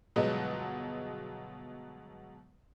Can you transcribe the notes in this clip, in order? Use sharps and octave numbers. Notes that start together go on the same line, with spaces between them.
G1 B2 F#3 G#3 D#5